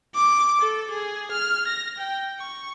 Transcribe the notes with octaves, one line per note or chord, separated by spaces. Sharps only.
D6
A4
G#4
F6
A#6
G5
C#6